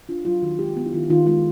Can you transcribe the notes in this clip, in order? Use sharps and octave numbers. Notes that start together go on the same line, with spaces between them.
D4 F4
F#3 F4
D#3 F#4
G#3 G4
B3
E4
D#3 F4
D#3 F4
G#3 F4